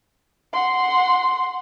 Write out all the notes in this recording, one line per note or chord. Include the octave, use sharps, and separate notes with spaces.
F#5 C6